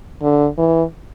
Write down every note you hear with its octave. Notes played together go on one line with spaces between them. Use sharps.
D3
E3